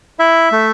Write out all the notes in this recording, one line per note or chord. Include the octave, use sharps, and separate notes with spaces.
E4 E5
A3